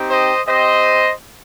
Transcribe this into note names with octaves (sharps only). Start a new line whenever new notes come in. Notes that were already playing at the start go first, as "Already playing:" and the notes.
Already playing: C4 D#4 G4
C5 D#5
C4 G4 C5 D#5